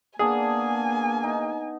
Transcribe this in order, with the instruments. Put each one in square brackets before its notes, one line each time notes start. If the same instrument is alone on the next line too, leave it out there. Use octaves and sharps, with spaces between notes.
[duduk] A#3 [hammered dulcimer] B3 D4 A5 [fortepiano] G#4 [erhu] G#5
[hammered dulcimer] D#4